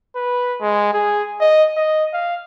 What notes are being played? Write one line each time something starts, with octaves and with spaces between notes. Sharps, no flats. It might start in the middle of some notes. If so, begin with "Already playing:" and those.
B4
G#3
G#4
D#5
D#5
F5